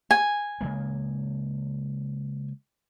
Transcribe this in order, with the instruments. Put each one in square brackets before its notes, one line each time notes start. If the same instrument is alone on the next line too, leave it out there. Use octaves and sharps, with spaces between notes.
[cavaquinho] G#5
[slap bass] C#3 G#3 A#3